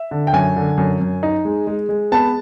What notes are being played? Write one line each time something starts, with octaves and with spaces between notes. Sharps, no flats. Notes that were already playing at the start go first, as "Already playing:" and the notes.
Already playing: E5
D3
G5
F#2 G#5
D3
F#2
F#2
D#4
G#3
G#3
G#3
B3 A5